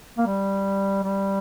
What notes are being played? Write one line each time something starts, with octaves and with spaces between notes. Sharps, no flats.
A#3
G3
G3